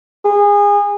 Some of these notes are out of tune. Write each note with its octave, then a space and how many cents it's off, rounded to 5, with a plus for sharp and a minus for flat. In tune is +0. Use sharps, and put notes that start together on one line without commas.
G#4 -25